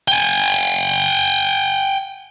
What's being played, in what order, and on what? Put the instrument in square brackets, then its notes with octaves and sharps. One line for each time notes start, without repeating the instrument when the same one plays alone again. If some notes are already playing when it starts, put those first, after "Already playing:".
[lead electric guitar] G5 G#5